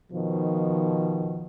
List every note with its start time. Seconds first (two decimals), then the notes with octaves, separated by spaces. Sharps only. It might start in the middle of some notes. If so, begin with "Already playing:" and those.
0.11 B2 D#3 F3